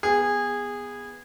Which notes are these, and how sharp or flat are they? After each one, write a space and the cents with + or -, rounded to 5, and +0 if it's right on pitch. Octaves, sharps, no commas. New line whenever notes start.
B3 +0 G#4 -20